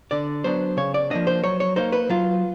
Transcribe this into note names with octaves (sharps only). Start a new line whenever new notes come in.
D3 D5
F#3 B3 D4 C5
C#3 C#5
D5
F3 A#3 D4 D#5
C5
F#3 C#5
C#5
A#3 D#4 C5
B4
F#3 F4